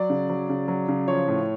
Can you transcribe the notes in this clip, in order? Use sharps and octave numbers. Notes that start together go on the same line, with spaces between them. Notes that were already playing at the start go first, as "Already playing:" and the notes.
Already playing: F#3 D5
C#3
F#3
C#3
F#3
C#3
F3 C#5
A2